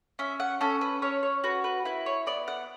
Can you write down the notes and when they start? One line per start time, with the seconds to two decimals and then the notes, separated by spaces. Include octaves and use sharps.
0.19 C#4 E5
0.40 F#5
0.61 C#4 A4
0.81 B4
1.02 C#4 C#5
1.23 C#5
1.44 F#4 B4
1.64 B4
1.85 E4 B4
2.06 C#5
2.27 B3 D5
2.48 F#5